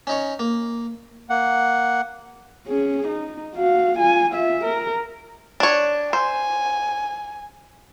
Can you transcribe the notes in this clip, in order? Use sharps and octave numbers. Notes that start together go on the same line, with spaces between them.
C#4 D#4 C#5
A#3
A#3 F#5
C#4 G#4
D#4
F#4 F5
F4 G#5
F4 E5
A#4
D4 C#5
C5 G#5